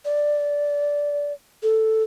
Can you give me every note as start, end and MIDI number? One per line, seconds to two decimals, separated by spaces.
0.05 1.33 74
1.63 2.03 69